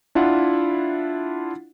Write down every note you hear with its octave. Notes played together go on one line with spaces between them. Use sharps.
D4 E4 F4 F#5